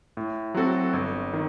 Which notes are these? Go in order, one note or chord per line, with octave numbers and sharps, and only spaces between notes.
A2
F#3 C4 F#4 A4
G1
D#3